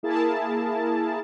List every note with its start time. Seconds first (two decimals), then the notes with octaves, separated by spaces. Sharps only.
0.03 A#3 E4 G#4 A#4 A5